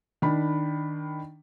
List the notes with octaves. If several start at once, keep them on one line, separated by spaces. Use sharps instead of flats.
D#3 D4 B5